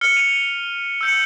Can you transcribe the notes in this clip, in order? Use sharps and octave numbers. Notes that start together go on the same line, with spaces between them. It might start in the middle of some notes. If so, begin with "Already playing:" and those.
F6 C#7 G7
D#7 F7
E6 G6 C#7